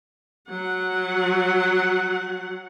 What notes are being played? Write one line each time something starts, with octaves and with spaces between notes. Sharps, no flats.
F#3 F#5